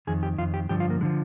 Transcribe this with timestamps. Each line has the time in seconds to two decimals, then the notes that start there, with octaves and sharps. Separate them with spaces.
0.07 F2 D#3 G#4
0.23 G4
0.38 F2 F4
0.41 D#3
0.54 G4
0.69 G2 D3 F3 G4
0.80 F4
0.90 A#3
1.01 D3 F3 G#3